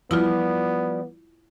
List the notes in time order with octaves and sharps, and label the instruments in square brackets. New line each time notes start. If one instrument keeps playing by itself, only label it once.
[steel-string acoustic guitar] F3 G3 D5 [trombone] B3 [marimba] E4 F4